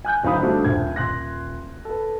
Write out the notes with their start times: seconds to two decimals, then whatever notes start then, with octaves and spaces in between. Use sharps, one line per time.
0.05 G#5 F#6 G6
0.23 D1 C4 D#4 F5 B5 D#6
0.43 G3 A3 C4 D4 F#4
0.64 D#1 G#6
0.96 D#1 C6 F#6 A#6
1.85 A4 B4